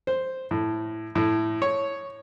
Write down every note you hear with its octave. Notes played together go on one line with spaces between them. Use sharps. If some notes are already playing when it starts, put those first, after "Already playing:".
C5
A2
A2
C#5